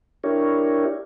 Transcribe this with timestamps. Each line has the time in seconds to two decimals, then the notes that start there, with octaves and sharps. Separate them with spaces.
0.24 D4 E4 G4 A#4 C#5